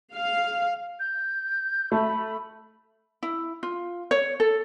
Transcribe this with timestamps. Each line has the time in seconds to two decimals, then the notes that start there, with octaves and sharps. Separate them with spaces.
0.15 F5
1.00 G6
1.92 A3 B5
3.23 E4
3.63 F4
4.11 C#5
4.40 A4